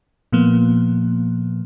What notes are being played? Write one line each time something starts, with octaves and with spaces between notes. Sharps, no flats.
A#2 F3 A#3 B3